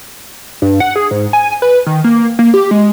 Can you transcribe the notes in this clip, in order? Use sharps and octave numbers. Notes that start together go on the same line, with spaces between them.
G2
F#5
G#4
G#2
G#5
B4
D#3
A#3
A#3
G4
G#3